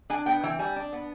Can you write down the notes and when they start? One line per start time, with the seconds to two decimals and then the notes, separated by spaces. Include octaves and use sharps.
0.10 D4 G#5
0.26 B3 G5
0.43 E3 G5
0.59 G3 G#5
0.76 D4
0.93 B3